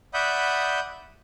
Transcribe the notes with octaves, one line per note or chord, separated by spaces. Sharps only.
D5 E5 F#5 B5 D#6 G6